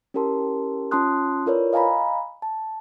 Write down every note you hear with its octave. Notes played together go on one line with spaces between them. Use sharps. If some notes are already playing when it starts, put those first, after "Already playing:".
C#4 E4 G4 A#4 A5 C6
C#4 F4 A5 C6 D#6 F#6
E4 F4 A#4 B4 C#5 D5
D#5 F5 G#5 A#5 B5
A5